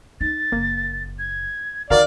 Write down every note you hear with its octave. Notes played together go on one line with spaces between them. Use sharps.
D#4 A6
F#1 A#3
G#6
D#3 F#4 A#4 D5 F5 F6